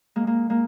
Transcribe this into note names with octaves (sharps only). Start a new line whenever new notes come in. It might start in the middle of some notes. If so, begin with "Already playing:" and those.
G#3 A#3
G#3 A#3
G#3 A#3